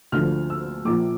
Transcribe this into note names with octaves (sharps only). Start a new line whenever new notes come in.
D2 D3 F3 F6
E6
A#1 A#2 F3 D6